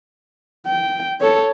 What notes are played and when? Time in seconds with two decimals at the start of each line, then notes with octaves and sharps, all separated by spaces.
0.67 G5
1.21 A4 C#5